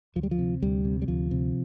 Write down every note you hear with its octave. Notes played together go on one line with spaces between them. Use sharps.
D2 F3
G3
F3
C3
D2 G3
C3
G3
D2 F3
C3